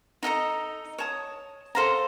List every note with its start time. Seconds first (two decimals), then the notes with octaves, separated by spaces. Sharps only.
0.23 D#4 A4 D#5 A#5
0.98 C#5 A5 D#6
1.75 A4 C5 F5 A#5